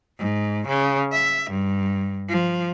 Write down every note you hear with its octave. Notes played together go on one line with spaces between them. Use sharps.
G#2
C#3
E5
G2
F3